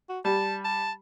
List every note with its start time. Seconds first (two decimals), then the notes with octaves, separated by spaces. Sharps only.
0.09 F#4
0.25 G3 A5
0.65 A5